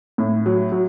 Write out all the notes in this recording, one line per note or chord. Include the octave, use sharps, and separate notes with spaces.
A2
F#3
F#3